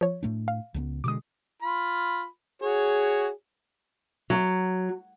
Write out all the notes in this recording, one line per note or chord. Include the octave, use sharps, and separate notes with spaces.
F3 C#5
A2 A3 D4
F5
C#2 F#3 B3
B2 D3 G#3 D6 D#6
F4 B5
F#4 G#4 C#5
F#3